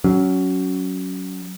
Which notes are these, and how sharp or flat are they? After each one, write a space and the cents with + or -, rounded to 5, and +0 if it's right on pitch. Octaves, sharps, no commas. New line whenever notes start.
F#3 +15 C#4 +10